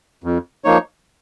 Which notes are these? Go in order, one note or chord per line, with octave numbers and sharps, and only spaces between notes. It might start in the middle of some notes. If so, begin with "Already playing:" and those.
F2
F3 A#3 D#4 C#5